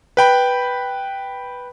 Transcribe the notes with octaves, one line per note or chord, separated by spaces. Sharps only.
B4 G5 B5